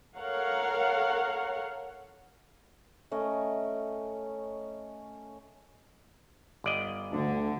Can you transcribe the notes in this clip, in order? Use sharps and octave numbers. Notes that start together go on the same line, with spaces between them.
A4 A#4 C#5 F5 F#5
A3 C#4 A#4 D#5
G1 D5 D#5
D2 D3